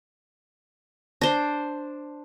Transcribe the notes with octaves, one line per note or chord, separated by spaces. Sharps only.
D4 C5